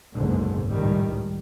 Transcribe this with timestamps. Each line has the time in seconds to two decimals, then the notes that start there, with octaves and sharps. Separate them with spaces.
0.14 F#1 C2 G#2 B2 D3
0.68 C#2 A2 D#3 G3